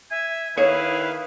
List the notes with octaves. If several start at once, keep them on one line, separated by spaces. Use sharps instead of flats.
E5 G#5
D#3 E4 G#4 B4 C#5 F5